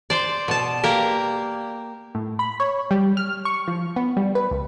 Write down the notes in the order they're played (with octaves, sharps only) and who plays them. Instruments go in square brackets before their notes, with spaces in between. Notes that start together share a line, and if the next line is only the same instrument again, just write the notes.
[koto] C5 D5
B2 A5
A#3 G4 A#4
[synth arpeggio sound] A2
B5
C#5
G3
F6
C#6
F3
B3
G3
B4
C#2